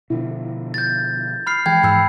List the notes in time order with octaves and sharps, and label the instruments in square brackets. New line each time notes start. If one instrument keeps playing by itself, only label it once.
[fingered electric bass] B2 D3 F3 [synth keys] E4
[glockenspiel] G6 A6
B5 F6 C7
[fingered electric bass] E3 F3 G#3 [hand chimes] G5 B5 [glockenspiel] G#6
[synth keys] G#2 [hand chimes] B5 E6 C7